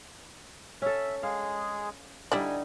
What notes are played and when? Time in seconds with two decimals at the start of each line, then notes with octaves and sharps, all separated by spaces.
0.82 C#4 A4 E5
1.23 G#3 G#4 F5
2.32 D3 G3 D#4 E4 D5 G#5